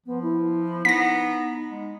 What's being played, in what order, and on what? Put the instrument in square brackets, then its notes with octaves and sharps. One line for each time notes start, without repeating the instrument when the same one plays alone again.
[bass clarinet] F3 [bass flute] B3
[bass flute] E4
[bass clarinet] B3 [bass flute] D#4 [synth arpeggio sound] A#6 B6
[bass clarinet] G#3